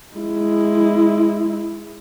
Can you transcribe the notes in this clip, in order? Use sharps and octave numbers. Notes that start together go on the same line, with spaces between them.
G#3 E4